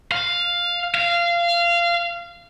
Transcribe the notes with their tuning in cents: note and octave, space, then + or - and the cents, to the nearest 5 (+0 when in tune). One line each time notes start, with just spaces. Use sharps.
F5 +5
F5 -20